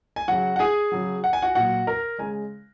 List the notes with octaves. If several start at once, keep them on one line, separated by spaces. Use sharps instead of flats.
G#5
C#3 F#3 F#4 F#5
F#5
G#4 G#5
C#3 F#3
F#5
G#5
F#4 F#5
A#2 F#3 F#4 F#5
A#4 A#5
C#3 G#3 G#5